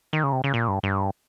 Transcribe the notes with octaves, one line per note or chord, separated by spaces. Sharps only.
D#3
C#3
C3
C#3
A#2
G2
G2